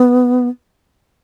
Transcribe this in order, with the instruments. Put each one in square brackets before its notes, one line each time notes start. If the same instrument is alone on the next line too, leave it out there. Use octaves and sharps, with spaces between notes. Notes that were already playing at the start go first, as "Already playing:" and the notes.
Already playing: [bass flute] B3